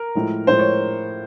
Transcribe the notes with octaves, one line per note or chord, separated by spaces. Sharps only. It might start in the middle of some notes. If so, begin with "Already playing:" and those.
Already playing: A#4
A2 F3 G#3
A2 F3 G#3 C5
C#5